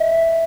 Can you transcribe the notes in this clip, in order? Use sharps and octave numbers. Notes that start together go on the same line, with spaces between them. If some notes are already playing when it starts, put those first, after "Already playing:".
Already playing: D#5 E5